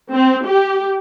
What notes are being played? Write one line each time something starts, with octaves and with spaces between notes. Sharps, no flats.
C4
G4